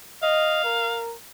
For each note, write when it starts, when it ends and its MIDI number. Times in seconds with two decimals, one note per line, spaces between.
0.23 0.62 75
0.23 1.02 77
0.64 1.14 70